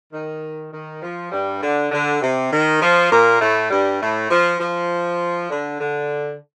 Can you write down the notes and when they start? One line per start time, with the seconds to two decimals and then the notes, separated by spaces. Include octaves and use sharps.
0.12 D#3
0.72 D#3
1.02 F3
1.31 G2 G3
1.62 D3
1.91 D3
2.21 C3
2.51 D#3
2.81 F3
3.11 A#2 A#3
3.40 A2 A3
3.70 G2 G3
4.00 A2 A3
4.30 F3
4.60 F3
5.50 D3
5.80 D3